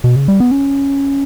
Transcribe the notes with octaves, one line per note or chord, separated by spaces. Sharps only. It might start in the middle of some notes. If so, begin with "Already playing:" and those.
B2
C#3
G3
B3
C#4